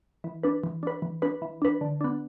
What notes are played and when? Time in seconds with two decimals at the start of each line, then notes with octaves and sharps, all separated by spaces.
0.24 E3
0.43 D4 B4
0.64 E3
0.83 D4 B4
1.02 E3
1.22 D4 B4
1.42 E3
1.62 D4 B4
1.81 D3
2.01 B3 D4